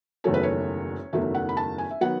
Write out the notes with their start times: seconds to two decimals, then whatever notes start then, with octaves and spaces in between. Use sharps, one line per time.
0.24 F#1 E2 D#3 F#3 A3 C#5
0.34 B4
0.43 C#5
1.13 F#1 E2 D#3 F#3 A3 E5
1.35 F#5
1.49 B5
1.57 A5
1.78 G#5
1.90 E5
2.01 D#3 F#3 B3 F#5